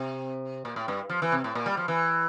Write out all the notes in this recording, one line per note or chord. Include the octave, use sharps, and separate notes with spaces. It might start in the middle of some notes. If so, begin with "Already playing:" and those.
Already playing: C3
A#2
A2
G2
F3
E3
C3
A2
A#2
G3
F3
E3